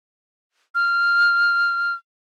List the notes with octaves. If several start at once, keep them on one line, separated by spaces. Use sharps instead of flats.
F6